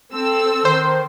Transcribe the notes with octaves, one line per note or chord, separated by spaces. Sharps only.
C4 A4 E6
D#3 C5